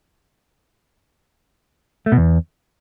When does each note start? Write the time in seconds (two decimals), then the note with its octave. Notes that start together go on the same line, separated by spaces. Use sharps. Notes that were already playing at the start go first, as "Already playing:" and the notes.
2.06 A3
2.12 B2
2.18 E2